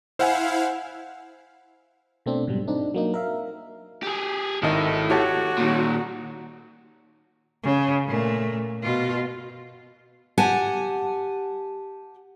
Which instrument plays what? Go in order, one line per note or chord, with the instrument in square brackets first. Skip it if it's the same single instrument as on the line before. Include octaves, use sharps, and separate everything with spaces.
[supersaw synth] E4 F5 [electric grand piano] C5 F#5 G#5
[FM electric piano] B2 A3 C4 D4
G#2 B2 F#3 G3
C4 D4 D#4
F#3 A#3 D#4
A#4 E5 F5
[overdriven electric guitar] G4 G#4
[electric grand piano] G#1 D#3 D#5 [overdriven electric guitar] E4 A4
[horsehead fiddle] F#4 [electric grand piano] G4 C#5 A5
[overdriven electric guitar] A#2 D#3
[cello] C#3
A#2 A3
B2 F4
[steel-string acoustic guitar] G4 F#5 G#5 A5